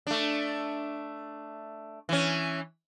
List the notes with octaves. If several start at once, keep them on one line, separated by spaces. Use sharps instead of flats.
A3 D4
E3 C#4